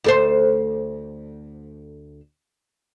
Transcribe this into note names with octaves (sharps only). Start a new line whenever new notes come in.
D2 A4 C5